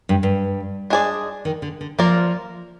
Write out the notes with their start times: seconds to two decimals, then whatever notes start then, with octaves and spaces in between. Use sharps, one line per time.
0.09 G2
0.23 G2
0.90 G#3 D4 G#4 D5
1.45 D#3
1.62 D3
1.81 D3
1.99 F3 A#3 F4 A#4 D5